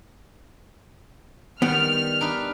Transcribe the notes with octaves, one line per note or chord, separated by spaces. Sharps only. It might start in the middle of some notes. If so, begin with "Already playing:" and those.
D#3 G3 B3 F6
D4 D#4 B4